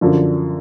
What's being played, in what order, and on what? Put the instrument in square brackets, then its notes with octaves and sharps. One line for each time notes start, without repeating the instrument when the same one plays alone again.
[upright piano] F#2 D3 F3